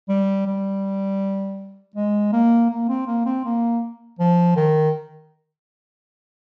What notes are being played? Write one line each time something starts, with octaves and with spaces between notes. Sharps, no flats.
G3
G3
G#3
A#3
A#3
C4
A#3
C4
A#3
F3
D#3